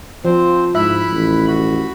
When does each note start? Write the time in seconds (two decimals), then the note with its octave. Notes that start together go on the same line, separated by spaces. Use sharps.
0.25 F3 C4 C5
0.75 G#2 E4 E5 B5 F#6
1.11 A1
1.48 F#4 B5